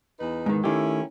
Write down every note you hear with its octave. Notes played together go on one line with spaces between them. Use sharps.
E2 D#4 B4
G#2 D#3
D#3 A3 C#4 E4 G4